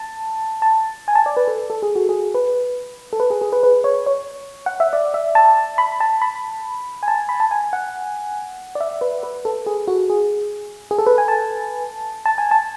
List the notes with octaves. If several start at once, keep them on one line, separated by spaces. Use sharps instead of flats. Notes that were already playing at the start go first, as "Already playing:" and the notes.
Already playing: A5
A5
G#5
A5
D5
B4
A4
A4
G#4
F#4
G#4
B4
A4
B4
G#4
G#4
B4
B4
C#5
C#5
F#5
E5
D5
E5
A5
B5
A5
B5
G#5
A5
B5
A5
G#5
F#5
D5
E5
B4
B4
A4
G#4
F#4
G#4
G#4
A4
B4
G#5
A5
A5
G#5
A5